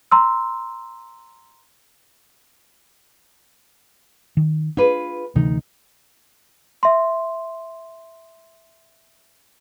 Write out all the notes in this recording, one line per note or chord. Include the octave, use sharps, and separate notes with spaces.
A#5 C6 E6
D#3
D4 F4 G#4 B4
D2 C3 E3 D#4
E5 C6